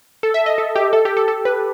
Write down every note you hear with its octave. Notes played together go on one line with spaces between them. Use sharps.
A4
E5
D#5
A4
G4
A4
G4
A4
A4
B4